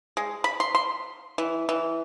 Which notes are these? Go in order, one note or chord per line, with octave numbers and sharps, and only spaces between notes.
G#3
B5
C6
C6
E3
E3